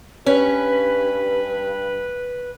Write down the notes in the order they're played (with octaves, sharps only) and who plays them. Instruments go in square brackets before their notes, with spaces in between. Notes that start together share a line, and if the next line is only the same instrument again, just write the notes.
[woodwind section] G2 [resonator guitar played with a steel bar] C#4 [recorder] B4